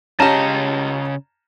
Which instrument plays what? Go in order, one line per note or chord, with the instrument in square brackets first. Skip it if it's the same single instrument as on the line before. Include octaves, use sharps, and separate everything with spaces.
[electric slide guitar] C#3 D#5 [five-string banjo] C#4 G4 [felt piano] A5 A#5 E7